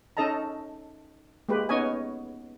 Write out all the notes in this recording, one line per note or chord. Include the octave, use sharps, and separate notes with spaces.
C#4 D#4 A4 D#5 A5 A#5
G#3 A#3 G4 B4
B3 C#4 D#4 C#5 D#5 G#5